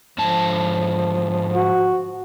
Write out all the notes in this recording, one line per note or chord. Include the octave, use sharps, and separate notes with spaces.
G#2 D3 F3 A5
F#4